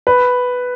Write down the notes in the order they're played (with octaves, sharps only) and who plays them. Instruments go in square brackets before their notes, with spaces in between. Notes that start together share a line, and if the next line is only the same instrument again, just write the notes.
[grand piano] B4